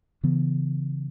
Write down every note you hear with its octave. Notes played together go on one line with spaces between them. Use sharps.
C#3 E3 B3